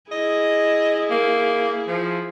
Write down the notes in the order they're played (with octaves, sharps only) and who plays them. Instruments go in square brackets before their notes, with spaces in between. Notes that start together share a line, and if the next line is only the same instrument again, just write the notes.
[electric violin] E4 G#4 [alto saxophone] D#5
[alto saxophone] A#3
F3